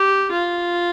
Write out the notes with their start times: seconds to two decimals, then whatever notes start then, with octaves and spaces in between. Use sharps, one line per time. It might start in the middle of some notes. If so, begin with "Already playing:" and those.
Already playing: G4
0.32 F4